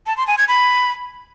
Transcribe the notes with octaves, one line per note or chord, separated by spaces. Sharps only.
A5
C6
G#5
G#6
B5